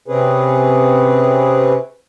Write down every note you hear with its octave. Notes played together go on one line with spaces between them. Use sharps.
C3 C4 C#4 G#4 B4